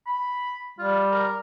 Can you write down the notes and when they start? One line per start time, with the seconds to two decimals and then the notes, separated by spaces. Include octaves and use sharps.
0.07 B5
0.79 G3 F4
1.12 A#4